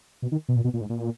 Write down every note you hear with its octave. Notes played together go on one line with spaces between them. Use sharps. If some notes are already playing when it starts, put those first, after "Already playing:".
B2
D#3
B2
A#2
B2
A#2
G#2
A#2